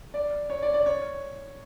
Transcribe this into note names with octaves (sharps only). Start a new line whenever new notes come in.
D5
C#5
D5
D5
C#5